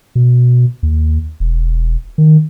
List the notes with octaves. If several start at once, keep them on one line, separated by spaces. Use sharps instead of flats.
B2
D#2
E1
D#3